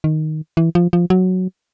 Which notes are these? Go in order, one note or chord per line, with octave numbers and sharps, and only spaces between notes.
D#3
E3
F3
F3
F#3